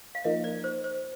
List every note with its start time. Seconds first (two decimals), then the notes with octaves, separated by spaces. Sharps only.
0.15 F5
0.24 F3 A#3 D#4 D#5
0.44 D5
0.64 C5
0.84 C5